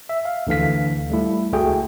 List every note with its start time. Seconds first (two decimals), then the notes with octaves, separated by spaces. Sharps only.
0.09 E5
0.25 F5
0.47 D2 D3 E3 F5 B6
1.10 G3 A3 E4
1.52 C#2 G#3 A3 F#4 G#4 G5